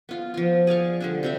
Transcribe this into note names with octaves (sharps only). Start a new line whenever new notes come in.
B3 F4
F3 F4
G#4 D5 F5 C#6
D3 G3 D4
C3 G3 E5